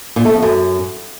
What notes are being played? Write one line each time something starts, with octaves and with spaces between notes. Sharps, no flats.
A#2
A3
F2
F#2